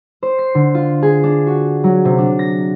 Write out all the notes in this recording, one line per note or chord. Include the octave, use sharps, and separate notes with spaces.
C5
C7
D3
F4
G#4
D4
F#4
F#3
C3
D4
A#6